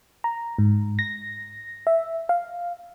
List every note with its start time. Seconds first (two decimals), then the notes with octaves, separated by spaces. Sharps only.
0.24 A#5
0.58 G#2
0.99 A#6
1.87 E5
2.29 F5